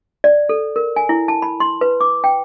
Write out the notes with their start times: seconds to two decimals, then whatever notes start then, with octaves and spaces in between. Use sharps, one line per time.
0.24 D5
0.49 A4
0.76 A#4
0.96 G#5
1.09 E4
1.28 A5
1.42 B5
1.60 C6
1.81 B4
2.01 D6
2.24 G5